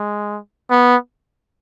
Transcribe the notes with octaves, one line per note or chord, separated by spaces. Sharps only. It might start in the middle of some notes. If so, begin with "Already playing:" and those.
Already playing: G#3
B3